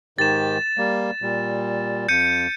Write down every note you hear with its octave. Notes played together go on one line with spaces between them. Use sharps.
G#2 D#3 G4 A6 E7
G3 A#3
A#2 G3
F2 G6 C#7 D#7